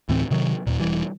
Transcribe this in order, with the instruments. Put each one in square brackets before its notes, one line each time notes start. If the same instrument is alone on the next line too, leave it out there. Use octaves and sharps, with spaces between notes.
[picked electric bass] D2 A2 E3 C4
C3 D#3 F#3
D#2 A#2
E1 C2 E3 G3